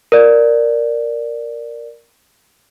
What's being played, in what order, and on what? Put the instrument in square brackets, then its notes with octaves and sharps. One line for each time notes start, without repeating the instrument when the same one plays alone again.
[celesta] A#4 D5